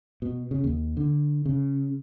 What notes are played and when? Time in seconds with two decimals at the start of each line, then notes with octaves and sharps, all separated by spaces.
0.22 B2
0.51 C#3
0.64 D#2
0.97 D3
1.46 C#3